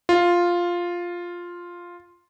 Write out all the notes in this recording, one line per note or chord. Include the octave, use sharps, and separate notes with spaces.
F4